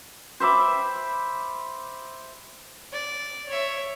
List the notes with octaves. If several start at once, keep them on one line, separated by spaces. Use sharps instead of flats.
C5 E5 B5 D6
D5
C#5 E5